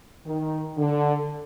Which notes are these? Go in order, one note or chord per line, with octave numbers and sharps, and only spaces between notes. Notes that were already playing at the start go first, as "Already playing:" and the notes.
D#3
D3